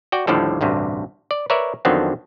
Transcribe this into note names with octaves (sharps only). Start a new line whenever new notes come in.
F#4 D5 G5
D#2 A2 D3 F3 G3 A4
A1 D2 G2 C3
D5
A#4 B4 C#5 D5 E5
F2 D3 D#3 F#3 B3 C4